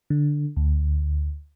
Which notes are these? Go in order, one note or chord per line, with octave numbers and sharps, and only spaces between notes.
D3
D2